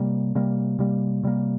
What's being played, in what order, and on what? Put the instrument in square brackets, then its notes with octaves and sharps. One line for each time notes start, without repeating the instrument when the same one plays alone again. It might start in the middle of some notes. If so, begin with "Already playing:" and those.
Already playing: [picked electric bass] C3 G3 A#3
C3 G3 A#3
C3 G3 A#3
C3 G3 A#3